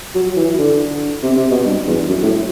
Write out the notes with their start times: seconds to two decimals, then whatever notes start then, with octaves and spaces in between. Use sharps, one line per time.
0.15 F#3
0.36 E3
0.58 D3
1.23 C3
1.36 C3
1.51 B2
1.65 G2
1.87 E2
2.08 F#2
2.23 A2